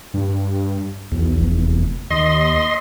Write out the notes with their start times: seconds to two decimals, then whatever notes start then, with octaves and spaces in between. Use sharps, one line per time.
0.14 G2
1.12 B1 E2
1.40 F1
2.10 D#2 D#5 C6